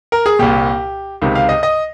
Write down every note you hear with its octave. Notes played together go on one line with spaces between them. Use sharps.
A#4
G#4
C2 A#2 G4
C#2 C3 D#3
F5
D#5
D#5